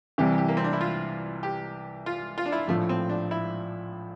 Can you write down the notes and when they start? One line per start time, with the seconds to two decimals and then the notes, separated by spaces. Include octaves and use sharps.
0.18 C2 C3 E3 G4
0.38 G4
0.48 A#3
0.57 C4
0.64 D4
0.73 E4
0.81 F4
1.43 G4
2.06 F4
2.38 F4
2.46 D4
2.52 E4
2.68 A#1 A2 F3 A3
2.89 C4
3.09 D4
3.31 E4